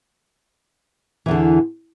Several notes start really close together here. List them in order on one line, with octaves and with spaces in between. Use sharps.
E3 E2 D3